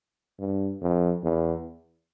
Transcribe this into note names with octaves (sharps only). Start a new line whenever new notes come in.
G2
F2
E2